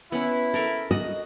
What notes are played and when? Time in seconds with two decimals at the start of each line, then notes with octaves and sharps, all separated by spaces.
0.12 B3 C#4 E4
0.54 A4 A#4 C#6
0.91 F#4 D#5